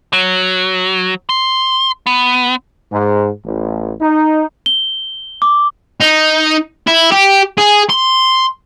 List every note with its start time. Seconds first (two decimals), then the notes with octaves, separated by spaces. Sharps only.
0.13 F#3
1.29 C6
2.07 B3
2.91 G#2
3.44 A1
4.00 D#4
4.66 G7
5.42 D6
6.00 D#4
6.87 E4
7.12 G4
7.58 G#4
7.89 C6